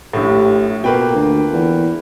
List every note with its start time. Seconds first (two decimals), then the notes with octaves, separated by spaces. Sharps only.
0.13 A#1 A2 G4
0.84 B2 A#3 F4 A4 B4 G5
1.15 D2
1.53 E2